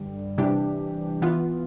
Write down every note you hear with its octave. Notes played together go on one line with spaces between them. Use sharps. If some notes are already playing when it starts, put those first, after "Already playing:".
Already playing: G2 D3 G3
C3 E3 G3 D4 G4
E3 B3 F4